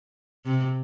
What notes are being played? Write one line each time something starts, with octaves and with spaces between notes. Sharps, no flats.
C3